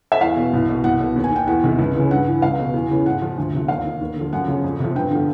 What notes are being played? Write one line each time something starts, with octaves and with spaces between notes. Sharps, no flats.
E5
E2 F5
B2
C2
B2
C2 F#5
B2
D#2
G#5
D#3 G5
E2 F#5
C3 D#3
C#2
C#3 E3
G2 F#5
E3
C#2 F5
B2
E2
C#3 E3
G#2 F#5
F3
D2
C3 F3
D#2 F5
D#3
D#2
D3
F3
F#2 F#5
C#3 F3
F2
C3 F3
G2 G5
D3 F3